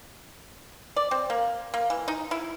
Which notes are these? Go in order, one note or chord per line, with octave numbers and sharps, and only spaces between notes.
D5
C4
A#3
A#3
E3
D#4
E4